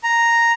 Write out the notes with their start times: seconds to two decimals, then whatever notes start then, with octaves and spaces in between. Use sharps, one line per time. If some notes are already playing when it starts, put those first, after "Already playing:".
0.03 A#5